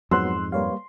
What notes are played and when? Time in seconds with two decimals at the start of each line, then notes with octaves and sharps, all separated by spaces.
0.11 F2 G#2 F#3 B3 C6 E6 F#6
0.52 G3 A#3 B4 C#5 F5